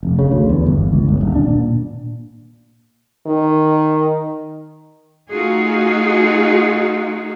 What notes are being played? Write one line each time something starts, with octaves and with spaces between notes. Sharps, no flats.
F1
C#3
D2
E2
G1
C#2
G1
D#1
D4
A#2
D#3
A3 D#4 F4 F#4 G#4